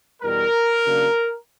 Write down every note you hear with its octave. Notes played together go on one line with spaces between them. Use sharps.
E2 B2 G3 A#4
C#3 F#3 A#3 D4